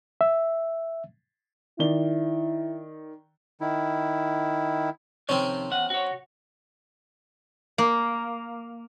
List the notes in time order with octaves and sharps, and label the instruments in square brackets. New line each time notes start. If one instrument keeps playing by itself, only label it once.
[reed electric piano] E5
[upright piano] D#3 D5 G7 [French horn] E4
[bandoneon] D#3 E4
[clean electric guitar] F2 C3 D#3 [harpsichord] C4 C#4
[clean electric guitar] E2 F#5
F#4 C#5
[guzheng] A#3